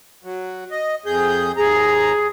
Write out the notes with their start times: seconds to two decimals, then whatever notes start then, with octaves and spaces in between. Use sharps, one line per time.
0.24 F#3
0.71 D#5
1.06 F2 G#4 G6
1.57 D#2 G#4 A#5